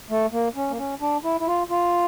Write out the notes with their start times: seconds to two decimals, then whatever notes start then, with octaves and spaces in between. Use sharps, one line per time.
0.10 A3
0.33 A#3
0.56 C#4
0.70 A#3
0.79 C#4
1.01 D4
1.24 E4
1.41 E4
1.47 F4
1.70 F4